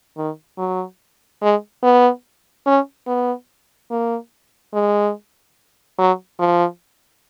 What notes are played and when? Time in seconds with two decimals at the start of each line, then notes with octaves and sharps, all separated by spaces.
0.17 D#3
0.58 F#3
1.42 G#3
1.83 B3
2.66 C#4
3.07 B3
3.91 A#3
4.74 G#3
5.99 F#3
6.40 F3